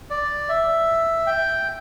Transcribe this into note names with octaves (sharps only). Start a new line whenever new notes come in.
D5
E5
G5